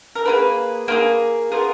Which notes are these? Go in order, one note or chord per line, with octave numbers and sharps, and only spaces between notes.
A#4
A#3 F4 G#4 B4
A#3 F4 G#4
B3 F4 G#4 A#4